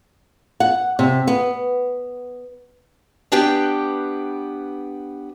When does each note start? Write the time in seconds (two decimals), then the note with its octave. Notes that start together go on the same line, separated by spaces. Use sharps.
0.60 F#5
0.99 C3
1.27 B3
3.32 B3 D4 G4 B4 G5